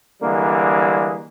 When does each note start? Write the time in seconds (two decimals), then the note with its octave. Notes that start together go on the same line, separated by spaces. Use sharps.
0.22 D3 E3 G3 G#3 A#3